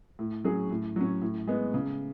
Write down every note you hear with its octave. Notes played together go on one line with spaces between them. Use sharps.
A2
F#3 C#4 G#4
A2
F#3 C#4
A2
G#3 B3
C#3